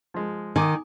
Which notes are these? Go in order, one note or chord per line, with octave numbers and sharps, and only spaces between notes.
F3 G#3
D#3 G#5 D6 D#6